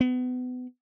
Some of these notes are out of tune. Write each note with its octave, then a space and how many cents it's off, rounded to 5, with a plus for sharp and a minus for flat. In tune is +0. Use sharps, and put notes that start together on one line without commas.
B3 +30